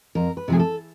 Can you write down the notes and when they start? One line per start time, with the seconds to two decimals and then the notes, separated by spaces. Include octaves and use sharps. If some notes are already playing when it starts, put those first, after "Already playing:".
0.15 F2 A#4
0.37 B4
0.48 C3 F3 A3 G#4
0.59 A4